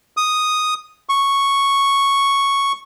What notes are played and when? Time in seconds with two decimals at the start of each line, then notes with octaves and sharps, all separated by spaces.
0.17 D#6
1.09 C#6